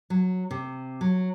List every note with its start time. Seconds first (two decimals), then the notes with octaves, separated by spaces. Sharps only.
0.10 F#3
0.51 C3
1.01 F#3